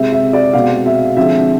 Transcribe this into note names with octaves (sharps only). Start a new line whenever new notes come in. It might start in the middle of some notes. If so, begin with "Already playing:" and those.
Already playing: C3 G#3 C4 E5
E5
D5
B2 G#3 C4 F5
E5
D3 F3 G#3 C4 E5